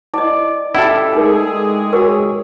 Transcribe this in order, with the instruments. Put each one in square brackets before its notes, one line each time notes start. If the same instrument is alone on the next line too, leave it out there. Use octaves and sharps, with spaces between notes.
[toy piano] E4 D#5 [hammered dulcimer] D5
[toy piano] C#4 [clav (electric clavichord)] E4 A4 [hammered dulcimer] G4 F5
[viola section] G#3 G#4 [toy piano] D4 D#4 A#4
[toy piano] F#4 A#4 [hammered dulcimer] C#5 G#5